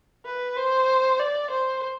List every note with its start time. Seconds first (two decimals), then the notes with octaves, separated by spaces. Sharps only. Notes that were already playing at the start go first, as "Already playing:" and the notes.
0.26 B4
0.56 C5
1.19 D5
1.51 C5